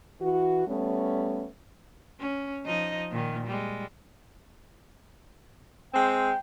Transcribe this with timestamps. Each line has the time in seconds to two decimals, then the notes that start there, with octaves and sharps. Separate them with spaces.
0.21 E3 F#4
0.67 G3 A3 B3 C#4
2.20 C#4
2.66 F3 D#4 D#5
3.11 A#2 D#3
3.47 G3 G#3
5.94 G#3 C4 G5